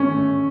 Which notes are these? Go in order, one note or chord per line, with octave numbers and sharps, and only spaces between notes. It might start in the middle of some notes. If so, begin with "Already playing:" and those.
Already playing: A3 C#4